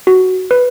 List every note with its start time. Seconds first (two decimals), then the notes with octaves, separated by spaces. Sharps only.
0.07 F#4
0.51 B4